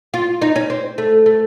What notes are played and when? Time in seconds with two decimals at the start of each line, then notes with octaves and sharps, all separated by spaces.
0.14 F4
0.42 D#4
0.56 C#4
0.70 C4
0.98 A3
1.26 A3